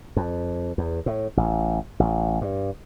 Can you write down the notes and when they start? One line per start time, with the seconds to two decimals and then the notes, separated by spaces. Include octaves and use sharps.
0.16 F2
0.78 E2
1.06 A2
1.37 A1
2.00 A1
2.41 G2